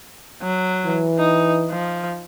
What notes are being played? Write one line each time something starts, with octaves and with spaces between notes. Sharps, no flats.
F#3
E3
D#4
F3